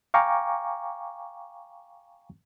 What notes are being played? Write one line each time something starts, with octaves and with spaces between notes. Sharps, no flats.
F5 G5 G#5 A#5 C#6 D6